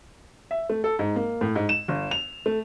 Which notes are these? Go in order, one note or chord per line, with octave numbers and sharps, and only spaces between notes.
E5
A3
A4
G#2
A#3
A2
G#2
E7
G1
F7
A3